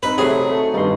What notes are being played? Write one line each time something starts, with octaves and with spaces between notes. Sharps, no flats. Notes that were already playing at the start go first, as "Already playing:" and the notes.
C4 D#4 B4
C3 F#3 A3 G#4
A3
G2 B2 D#3 D#4 F#4 C6